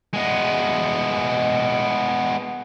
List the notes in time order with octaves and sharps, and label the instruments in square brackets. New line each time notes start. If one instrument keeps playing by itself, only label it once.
[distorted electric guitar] G#3 B3